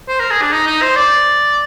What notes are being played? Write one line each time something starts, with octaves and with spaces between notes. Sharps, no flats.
C5
A#4
G#4
D4
D#4
D#4
C5
D5